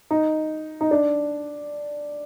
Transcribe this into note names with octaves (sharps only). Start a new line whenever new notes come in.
D#4
D#4
D4